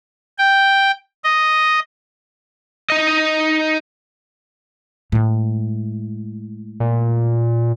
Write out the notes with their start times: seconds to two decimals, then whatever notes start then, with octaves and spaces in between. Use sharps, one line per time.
0.38 G5
1.24 D#5
2.90 D#4 D#5
5.12 A2 G#3
6.80 A#2